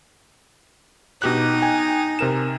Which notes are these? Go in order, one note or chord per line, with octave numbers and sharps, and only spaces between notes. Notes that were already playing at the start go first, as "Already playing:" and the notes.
B2 D#4 G4 F#6
G5 G#5
C3 A#4 E7